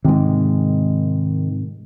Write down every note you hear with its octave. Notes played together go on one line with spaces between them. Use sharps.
G#2 C3 D#3 G#3